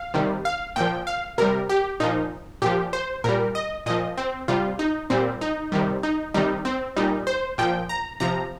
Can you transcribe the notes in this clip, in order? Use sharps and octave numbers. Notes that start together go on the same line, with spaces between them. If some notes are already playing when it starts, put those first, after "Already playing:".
Already playing: F5
C3 D#3 G3
F5
A#2 F3 G5
F5
C3 G3 A#4
G4
A#2 F3 D#4
A#2 F3 G4
C5
A#2 G3 A#4
D#5
A#2 F3 D#5
C4
C3 G3 F4
D#4
A#2 G3 C4
D#4
C3 D#3 G3
D#4
C3 D#3 G3 D#4
C4
A#2 G3 D#4
C5
A#2 F3 G5
A#5
C3 F3 A#5